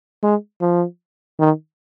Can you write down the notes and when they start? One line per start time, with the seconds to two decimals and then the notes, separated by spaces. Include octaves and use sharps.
0.23 G#3
0.61 F3
1.39 D#3